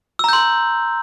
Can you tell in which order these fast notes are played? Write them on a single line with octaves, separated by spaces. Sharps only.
E6 A#5 G6 C6